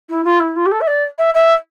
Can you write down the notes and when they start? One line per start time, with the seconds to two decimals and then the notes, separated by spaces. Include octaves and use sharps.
0.09 E4
0.24 F4
0.39 E4
0.56 F4
0.65 G4
0.71 A4
0.80 E5
0.87 D5
1.18 E5
1.34 E5